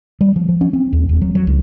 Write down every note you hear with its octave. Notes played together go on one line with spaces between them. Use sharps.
G3
F3
F3
C#4
C4
D#2
E1
F#3
F#3
C#2